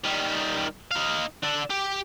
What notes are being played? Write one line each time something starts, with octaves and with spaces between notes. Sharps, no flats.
D#3 G3
D#4 F5
D4 A4
G4